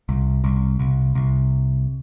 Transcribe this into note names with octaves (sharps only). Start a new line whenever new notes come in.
C2
C2
C2
C2